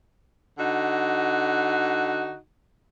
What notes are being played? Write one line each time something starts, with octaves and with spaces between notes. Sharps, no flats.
D3 D#4 F#4